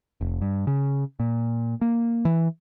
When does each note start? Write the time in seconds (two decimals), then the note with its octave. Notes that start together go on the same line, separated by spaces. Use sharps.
0.21 F1
0.41 G2
0.67 C#3
1.20 A#2
1.81 A#3
2.25 E3